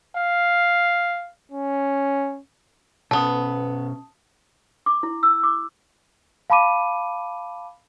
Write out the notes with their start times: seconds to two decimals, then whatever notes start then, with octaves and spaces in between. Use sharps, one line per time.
0.17 F5
1.52 C#4
3.11 B2 B3 C#4 A4 A5 D#6
4.86 D6
5.03 E4
5.23 E6
5.43 D6
6.50 F5 A5 B5 D6 D#7